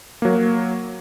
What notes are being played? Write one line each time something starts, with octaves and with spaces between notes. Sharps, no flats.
F#3 A#3